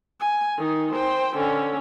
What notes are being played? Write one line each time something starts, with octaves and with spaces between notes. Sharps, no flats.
G#5
D#3 D#4
C5 G5
D3 C#4